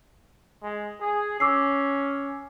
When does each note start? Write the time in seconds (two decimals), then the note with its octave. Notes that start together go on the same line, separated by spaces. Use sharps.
0.63 G#3
1.00 G#4
1.40 C#4 D6 E6 C7